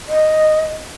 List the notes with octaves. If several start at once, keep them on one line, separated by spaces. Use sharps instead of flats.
D#5